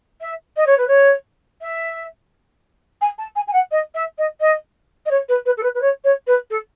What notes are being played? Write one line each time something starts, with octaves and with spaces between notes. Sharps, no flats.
E5
D#5
C#5
B4
C#5
E5
G#5
A5
G#5
G#5
F#5
D#5
E5
D#5
D#5
D#5
C#5
B4
B4
A4
B4
B4
C#5
C#5
B4
A4